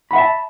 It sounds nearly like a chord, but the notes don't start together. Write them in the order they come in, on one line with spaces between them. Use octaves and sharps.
B5 F#5 E5 A5